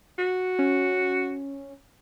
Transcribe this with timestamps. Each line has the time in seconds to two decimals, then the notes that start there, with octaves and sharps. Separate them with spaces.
0.18 F#4
0.59 C#4